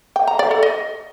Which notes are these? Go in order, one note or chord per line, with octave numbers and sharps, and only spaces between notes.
G5
A#5
D5
A4
D#5